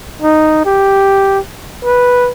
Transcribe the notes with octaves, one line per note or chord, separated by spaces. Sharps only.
D#4
G4
B4